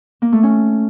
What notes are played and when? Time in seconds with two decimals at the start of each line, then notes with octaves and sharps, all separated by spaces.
0.22 A#3
0.32 A3
0.43 C#4